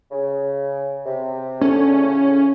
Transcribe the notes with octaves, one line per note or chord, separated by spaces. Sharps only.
C#3
C3
D3 C#4
A2 C#3